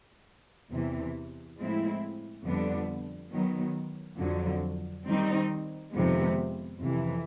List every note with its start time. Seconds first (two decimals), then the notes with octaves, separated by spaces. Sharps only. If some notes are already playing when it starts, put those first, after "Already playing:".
0.71 E2 C3 E3
1.58 A2 F3 G#3 C4 E4
2.45 F2 D3 G3 B3 D4
3.32 D#3 F#3 B3
4.18 F2 D3 F#3
5.05 D#3 G3 C4 D#4
5.92 F2 C3 D#3 G#3 B3
6.80 F2 C3 E3